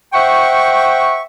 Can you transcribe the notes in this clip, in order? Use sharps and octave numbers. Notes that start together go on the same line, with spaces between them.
C5 E5 F#5 G5 C#6